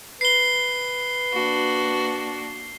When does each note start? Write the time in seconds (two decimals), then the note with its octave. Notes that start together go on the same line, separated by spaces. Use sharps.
0.21 B4 C7 G7
1.34 A#3 D4 F#4